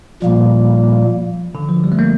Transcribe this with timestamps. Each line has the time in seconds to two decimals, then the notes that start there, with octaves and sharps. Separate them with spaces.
0.22 A#2 F3 G3 A#3
1.55 D3
1.69 F3
1.84 G3
1.92 A3
1.99 A#3